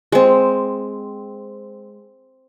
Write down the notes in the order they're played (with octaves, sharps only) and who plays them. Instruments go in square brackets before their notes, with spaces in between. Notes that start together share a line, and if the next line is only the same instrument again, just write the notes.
[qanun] G#3 C4